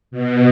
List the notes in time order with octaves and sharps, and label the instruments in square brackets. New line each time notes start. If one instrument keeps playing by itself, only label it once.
[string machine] B2